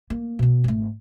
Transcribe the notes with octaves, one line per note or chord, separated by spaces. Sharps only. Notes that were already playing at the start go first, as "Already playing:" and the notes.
A#3
B2 B3
G#1 A3